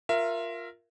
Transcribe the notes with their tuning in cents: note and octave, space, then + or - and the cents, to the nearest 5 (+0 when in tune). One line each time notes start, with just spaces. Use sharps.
F4 +10 A#4 +0 E5 +25